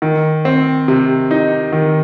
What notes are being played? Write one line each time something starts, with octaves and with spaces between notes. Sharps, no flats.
D#3
C4
C3
D#4
D#3